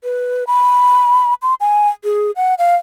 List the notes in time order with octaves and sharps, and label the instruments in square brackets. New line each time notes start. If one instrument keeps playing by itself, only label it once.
[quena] B4
B5
C6
G#5
G#4
F#5
F5